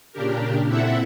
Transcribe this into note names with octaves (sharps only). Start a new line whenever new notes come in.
A#2 C#3 D4 G4 A#4
A#2 C4 E4 A4 E5 F#5